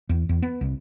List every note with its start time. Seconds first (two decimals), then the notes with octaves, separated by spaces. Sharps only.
0.09 E2
0.29 E2
0.42 B3
0.61 C2